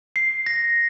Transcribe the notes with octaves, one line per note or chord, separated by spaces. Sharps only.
C7
A#6